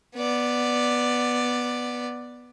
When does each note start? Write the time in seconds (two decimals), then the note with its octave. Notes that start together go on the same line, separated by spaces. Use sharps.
0.16 B3 D5